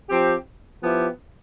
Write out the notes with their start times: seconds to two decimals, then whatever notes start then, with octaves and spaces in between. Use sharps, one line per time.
0.08 F3 C4 G4
0.81 F3 B3 E4 G4